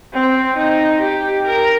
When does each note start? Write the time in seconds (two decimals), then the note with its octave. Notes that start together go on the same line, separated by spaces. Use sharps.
0.13 C4
0.57 D#4
1.01 G4
1.46 A#4